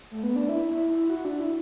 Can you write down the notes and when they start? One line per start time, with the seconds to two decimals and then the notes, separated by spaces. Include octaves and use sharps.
0.11 A3
0.23 B3
0.36 D4
0.49 E4
0.70 E4
0.89 E4
1.10 F#4
1.25 D4
1.40 E4